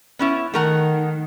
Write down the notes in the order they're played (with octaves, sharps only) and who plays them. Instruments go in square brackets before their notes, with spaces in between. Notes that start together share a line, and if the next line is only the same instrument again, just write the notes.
[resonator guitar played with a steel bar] B3 C#4 E4
[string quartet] D#3 [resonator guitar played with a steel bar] A3 A#4 F#5